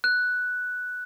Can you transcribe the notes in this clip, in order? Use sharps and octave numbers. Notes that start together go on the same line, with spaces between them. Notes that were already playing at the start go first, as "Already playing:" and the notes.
F#6